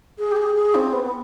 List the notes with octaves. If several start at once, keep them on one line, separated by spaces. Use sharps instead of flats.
G#4
G4
G#4
G#4
C4
B3
B3